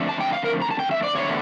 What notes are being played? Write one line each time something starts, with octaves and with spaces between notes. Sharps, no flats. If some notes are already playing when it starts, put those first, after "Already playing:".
Already playing: F2 D3 A3
A5
G5
F5
A#4
A#5
A5
G5
E5
D5
E2 D3 A3 C#5